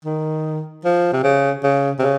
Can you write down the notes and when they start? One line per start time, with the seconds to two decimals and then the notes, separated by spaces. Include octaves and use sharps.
0.05 D#3
0.85 F3
1.13 C3
1.24 C#3
1.63 C#3
1.99 C3
2.03 C#3